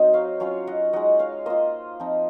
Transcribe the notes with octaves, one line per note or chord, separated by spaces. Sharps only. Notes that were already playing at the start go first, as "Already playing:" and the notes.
Already playing: F#3 C4 D#4 D#5
C#5 F5
F#3 C#4 F4 C#5 F5
D#5 F#5
G#3 D#4 D#5 F#5
C#5 F5
A#3 F4 C5 D#5
F3 C4 D#4